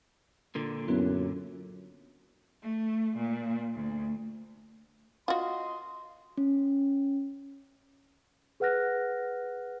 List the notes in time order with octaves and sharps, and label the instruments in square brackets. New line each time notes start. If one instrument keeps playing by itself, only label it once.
[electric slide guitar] A#2 D3
[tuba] F#2 [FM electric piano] B3 E4
[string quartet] A3
A#2
D2
[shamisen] F4 F#4 [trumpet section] D#5 C6
[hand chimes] C#4
[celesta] G#4 B4 F#5 F6 F#6 A#6